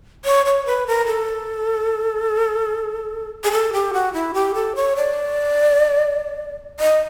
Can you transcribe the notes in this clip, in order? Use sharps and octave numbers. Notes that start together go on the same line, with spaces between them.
C#5
C#5
B4
A#4
A4
G#4
A4
G4
F#4
E4
G4
A4
C#5
D5
D#5